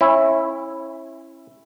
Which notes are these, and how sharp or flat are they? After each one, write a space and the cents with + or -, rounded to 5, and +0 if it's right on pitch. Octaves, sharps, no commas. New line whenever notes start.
C#4 -35 E4 +0